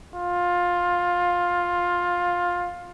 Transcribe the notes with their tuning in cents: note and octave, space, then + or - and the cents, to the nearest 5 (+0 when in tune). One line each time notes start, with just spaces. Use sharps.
F4 +15